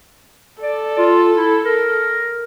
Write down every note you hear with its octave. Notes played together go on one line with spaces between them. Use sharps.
A4 D5
F4
E4
A#4